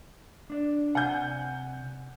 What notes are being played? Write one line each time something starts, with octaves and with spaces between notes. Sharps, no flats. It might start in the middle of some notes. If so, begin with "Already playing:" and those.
D4 D5
C3 F#5 G#5 G6